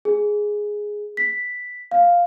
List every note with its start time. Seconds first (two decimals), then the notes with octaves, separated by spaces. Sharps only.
0.05 G#4
1.17 B6
1.91 F5